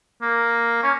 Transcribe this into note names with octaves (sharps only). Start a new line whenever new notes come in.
A#3
C#4